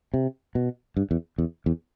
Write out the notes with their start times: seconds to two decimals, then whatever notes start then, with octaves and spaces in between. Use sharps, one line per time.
0.14 C3
0.55 B2
0.97 G2
1.11 E2
1.38 E2
1.66 E2